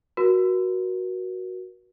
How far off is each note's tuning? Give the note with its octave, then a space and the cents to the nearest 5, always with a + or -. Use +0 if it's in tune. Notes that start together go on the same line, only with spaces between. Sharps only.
F#4 +0 A#4 +35